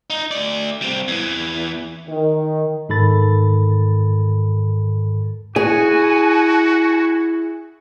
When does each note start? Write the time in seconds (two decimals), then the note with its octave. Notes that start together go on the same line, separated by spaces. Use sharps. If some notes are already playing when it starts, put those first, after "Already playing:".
0.10 D#4
0.31 A3 D5
0.82 G3 C4
1.08 E2 E3
2.08 D#3
2.89 G#2 D#3 A4 B5 A6
5.56 E4 F#4 G#4 G#5